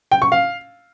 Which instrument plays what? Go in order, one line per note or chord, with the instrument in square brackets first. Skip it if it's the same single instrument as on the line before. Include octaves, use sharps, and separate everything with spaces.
[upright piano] G5
C#6
F5